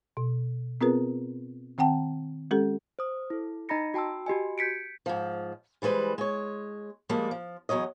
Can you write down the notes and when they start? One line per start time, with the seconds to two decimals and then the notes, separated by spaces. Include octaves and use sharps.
0.17 B2
0.81 B3 C4 F4 G#4 A#4 B4
1.78 D#3 C4 F#5 G5 A5
2.51 G#3 C#4 G4 A4
2.99 C5 D#6
3.30 E4 A4
3.69 D#4 D#5 A#5 B5 A#6 C#7
3.94 F#4 G5 A5 C6 E6
4.26 F#4 G4 D#5 G#5
4.58 G6 G#6 B6 C#7 D7
5.06 G#2 F3
5.82 E3 G3 G#3 B4 C5
6.18 G#3 C#5
7.09 F3 G3 G#3 A#3
7.31 F3
7.69 E2 C3 F#3 C#5 D#5